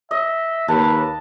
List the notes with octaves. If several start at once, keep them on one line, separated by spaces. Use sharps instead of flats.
D#5 E5
D#2 B4 A5